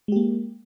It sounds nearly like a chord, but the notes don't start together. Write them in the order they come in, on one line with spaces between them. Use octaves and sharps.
G#3 G4 A#3